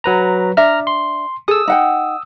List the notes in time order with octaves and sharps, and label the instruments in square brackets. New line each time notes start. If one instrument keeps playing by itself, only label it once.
[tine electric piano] F#3 B4 A#5
[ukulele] D4 E5 [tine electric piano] A#5 F6
[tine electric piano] C6
[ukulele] G#4 A4 [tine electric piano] D#6 E6
[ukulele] D#4 F#5 G5